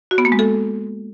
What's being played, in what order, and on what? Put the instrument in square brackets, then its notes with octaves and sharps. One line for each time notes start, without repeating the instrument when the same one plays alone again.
[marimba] F#4
B3
A#3
G#3
A4